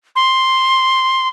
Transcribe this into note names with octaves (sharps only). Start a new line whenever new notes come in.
C6